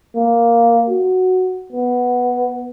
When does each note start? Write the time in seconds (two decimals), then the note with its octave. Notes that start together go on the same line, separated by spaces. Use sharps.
0.15 A#3
0.88 F#4
1.72 B3